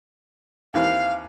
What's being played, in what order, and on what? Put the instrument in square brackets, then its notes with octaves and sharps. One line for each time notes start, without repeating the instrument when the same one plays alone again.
[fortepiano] D#2 E3 C4 [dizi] F5